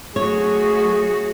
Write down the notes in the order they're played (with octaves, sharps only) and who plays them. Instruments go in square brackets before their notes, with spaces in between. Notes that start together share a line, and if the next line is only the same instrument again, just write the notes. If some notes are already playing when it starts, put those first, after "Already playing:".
[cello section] F#3 A3 F#4 [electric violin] G#4 [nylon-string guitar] C#5